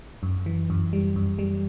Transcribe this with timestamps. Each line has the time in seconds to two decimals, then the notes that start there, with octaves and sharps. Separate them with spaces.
0.23 F#2
0.46 E3
0.70 F#2
0.93 G3
1.16 F#2
1.39 G3